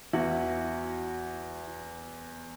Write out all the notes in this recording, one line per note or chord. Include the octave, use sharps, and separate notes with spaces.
E2 E4 F#4